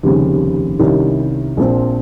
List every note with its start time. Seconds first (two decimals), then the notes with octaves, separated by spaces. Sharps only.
0.03 F1 D#2 C#3 G3 C4
0.79 C2 C3 D#3 G3 C#4
1.57 A#1 A#2 F3 C4